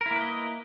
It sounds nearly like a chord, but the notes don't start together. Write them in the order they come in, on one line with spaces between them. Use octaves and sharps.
A#4 E4 A#3 B4 D#5